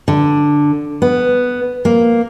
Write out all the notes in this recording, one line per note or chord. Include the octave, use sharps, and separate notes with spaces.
D3
B3
A#3